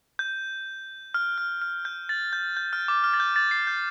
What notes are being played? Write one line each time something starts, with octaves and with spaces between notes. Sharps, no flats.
G6
F6
F6
F6
G6
A6
G6
G6
F6
D6
F6
A6
G6
A6
C7
G6